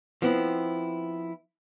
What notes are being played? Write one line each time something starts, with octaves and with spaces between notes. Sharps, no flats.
F3 B3 C4 E4